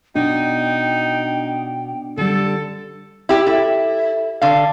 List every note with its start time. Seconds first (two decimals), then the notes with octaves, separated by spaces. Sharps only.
0.15 B2 D4 D#4 G5
2.18 D3 G3 A4
3.29 E4 G4
3.47 E4 A4 E5
4.42 D3 F5